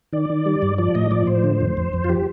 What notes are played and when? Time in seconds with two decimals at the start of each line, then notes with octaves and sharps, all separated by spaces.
0.13 D#3 D5
0.30 D#3
0.46 G3
0.62 G2
0.78 F3 D5
0.95 A2 D#5
1.11 F3 D5
1.27 A2 C5
1.44 D3
1.60 F2
1.77 F2
1.93 F2
2.04 F4
2.09 F3 G4